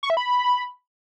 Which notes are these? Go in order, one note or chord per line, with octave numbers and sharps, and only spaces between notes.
C#6
E5
B5